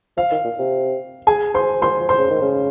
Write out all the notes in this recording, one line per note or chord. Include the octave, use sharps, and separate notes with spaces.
F3 F5
D#3
A#2
C3
G#4 G#5
C5 C6
A#2 C5 C6
F3
C5 C6
C#3
D#3
C#3